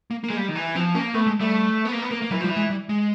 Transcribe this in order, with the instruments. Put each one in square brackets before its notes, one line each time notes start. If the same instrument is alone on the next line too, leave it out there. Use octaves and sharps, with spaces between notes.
[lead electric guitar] A#3
A#3
[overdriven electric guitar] G#3
G3
D#3
E3
[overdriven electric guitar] F3 [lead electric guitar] C4
[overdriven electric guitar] A#3 [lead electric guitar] C#4
[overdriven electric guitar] A3 [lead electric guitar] B3
[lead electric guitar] G#3
[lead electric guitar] G3 [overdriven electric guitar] A3
[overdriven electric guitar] B3
A#3
B3
A#3
A#3
[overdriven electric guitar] E3 [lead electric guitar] F#3
[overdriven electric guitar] F3
[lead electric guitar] G3
[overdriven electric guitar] E3
[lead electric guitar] G#3
G3
G#3